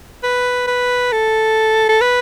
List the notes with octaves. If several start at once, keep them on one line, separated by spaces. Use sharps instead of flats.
B4
B4
A4
A4
B4